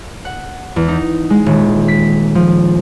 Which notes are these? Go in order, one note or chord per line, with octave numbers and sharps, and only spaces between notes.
F#5
E2
D#4
G#3
D#1
B6
F3